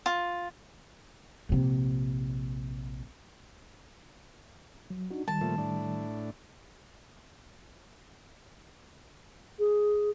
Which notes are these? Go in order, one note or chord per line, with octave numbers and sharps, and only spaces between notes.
F4
A#1 C3
F#3
D4 D#4 F#4
D#3 G3 A5
A#2 F3 A3
A2 D4
G#4